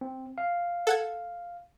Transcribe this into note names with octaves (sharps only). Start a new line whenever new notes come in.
C4
F5
A4 F#5 G#6